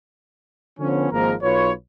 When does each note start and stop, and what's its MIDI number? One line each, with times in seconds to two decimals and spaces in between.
0.80 1.08 50
0.80 1.08 53
0.80 1.08 59
0.80 1.08 61
1.12 1.33 32
1.12 1.33 44
1.12 1.33 53
1.12 1.33 58
1.12 1.33 70
1.12 1.33 82
1.42 1.71 35
1.42 1.71 65
1.42 1.71 71
1.42 1.71 73